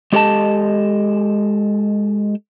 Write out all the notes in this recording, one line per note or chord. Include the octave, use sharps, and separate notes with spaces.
G#3 G4 A4 D#5 A5